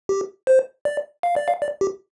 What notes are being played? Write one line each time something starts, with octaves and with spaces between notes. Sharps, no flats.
G4
C5
D5
F5
D5
F5
D5
G4